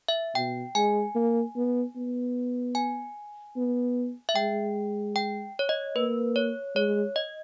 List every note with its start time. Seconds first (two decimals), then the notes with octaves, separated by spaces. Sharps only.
0.08 E5
0.35 B2 G5
0.75 G#3 G#5
1.15 A#3
1.56 B3
1.96 B3
2.75 G#5
3.56 B3
4.29 E5
4.36 G#3 G5
5.16 G5
5.59 C#5
5.69 D#5
5.96 A#3 B4
6.36 C#5
6.75 G#3 C#5
7.16 D#5